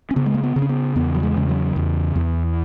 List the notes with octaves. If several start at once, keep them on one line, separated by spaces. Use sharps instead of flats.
C#4
C#3 B3
G#3
A#3
B3
C#3
C#4
B3
E2 B3
F#3
G#3
C#3
F#3
E2
E2